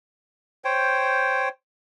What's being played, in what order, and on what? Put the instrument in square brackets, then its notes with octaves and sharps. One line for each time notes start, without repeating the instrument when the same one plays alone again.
[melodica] C5 C#5 G5